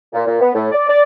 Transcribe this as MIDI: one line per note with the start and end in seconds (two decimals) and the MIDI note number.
0.14 0.26 46
0.27 0.39 46
0.41 0.50 59
0.55 0.71 45
0.72 0.88 74
0.88 1.03 74